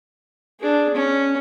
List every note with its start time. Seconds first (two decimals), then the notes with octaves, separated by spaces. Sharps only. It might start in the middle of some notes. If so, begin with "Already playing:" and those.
0.60 D4 G#4
0.94 C#4